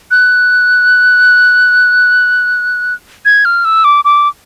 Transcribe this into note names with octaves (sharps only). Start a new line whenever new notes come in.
F#6
G#6
F6
E6
D6
D6